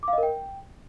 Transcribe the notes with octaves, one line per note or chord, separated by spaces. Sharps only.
D6
F5
D#5
A#4
G5